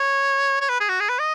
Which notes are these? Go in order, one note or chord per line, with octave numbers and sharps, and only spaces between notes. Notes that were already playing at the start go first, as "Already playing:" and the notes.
Already playing: C#5
C#5
B4
G#4
F#4
G#4
B4
D#5